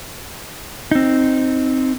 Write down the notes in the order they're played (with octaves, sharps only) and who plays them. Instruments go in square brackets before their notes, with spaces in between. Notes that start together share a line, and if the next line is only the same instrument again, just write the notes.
[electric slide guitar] C4 D#4